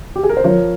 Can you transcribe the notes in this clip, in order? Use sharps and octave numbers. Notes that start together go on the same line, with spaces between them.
G4
G#4
A#4
C5
F3 A#4 C#5